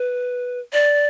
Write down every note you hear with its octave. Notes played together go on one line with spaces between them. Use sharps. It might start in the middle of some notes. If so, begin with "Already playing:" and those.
Already playing: B4
D5